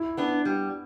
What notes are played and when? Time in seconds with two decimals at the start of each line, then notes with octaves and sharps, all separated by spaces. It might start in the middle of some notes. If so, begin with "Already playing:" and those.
Already playing: E4
0.17 B3 D4
0.45 G3